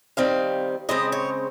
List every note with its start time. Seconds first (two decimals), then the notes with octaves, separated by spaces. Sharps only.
0.17 D#3 G3 C4 F5
0.89 C#3 G#3 C4 D#5
1.12 C#5